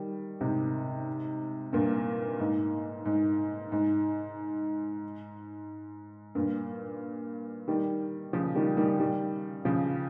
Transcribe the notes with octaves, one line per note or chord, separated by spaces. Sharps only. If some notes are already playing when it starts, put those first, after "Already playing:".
Already playing: D#3 G3
G#2 C3
G2 A#2
G#2
G#2
G#2
G2 A#2
D#3 G3
C#3 F3
D#3 G3
D#3 G3
D#3 G3
C#3 F3